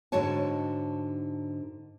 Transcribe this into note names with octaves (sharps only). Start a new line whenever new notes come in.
G#2 D3 D#4 F#4 C#5 A5